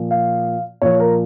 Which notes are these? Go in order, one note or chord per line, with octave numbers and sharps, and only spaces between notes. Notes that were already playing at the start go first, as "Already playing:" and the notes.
Already playing: A#2 F3
F5
A#2 F3 C#5
A#4